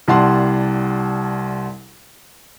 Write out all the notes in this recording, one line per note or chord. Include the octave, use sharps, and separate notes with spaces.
C2 G3 F#5 A5 C6